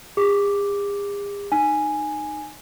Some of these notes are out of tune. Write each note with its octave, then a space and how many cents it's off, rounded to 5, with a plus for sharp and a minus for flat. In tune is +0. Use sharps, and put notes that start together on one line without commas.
G#4 -45 D6 +0
D#4 -20 G#5 +0